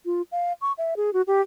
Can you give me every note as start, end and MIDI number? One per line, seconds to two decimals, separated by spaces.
0.05 0.22 65
0.32 0.53 77
0.61 0.72 85
0.78 0.94 76
0.97 1.13 68
1.13 1.22 66
1.27 1.41 67